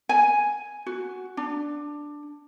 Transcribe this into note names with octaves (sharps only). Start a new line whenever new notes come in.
G#5
F#4
D4